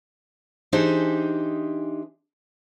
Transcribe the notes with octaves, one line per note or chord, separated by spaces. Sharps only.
E3 D4 D#4 G4 G#4 C5